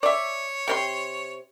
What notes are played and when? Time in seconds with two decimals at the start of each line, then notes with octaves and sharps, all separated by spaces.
0.03 C#5 D5 E5
0.68 C3 C#4 C6